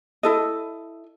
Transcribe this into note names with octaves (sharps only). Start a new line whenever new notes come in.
E4 A4 D#5